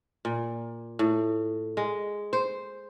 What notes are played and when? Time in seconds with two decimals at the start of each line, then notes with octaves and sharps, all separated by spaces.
0.25 A#2
0.99 A2
1.77 G#3
2.33 C5